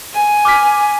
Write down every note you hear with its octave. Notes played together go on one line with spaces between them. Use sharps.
G#5
D6 F6 B6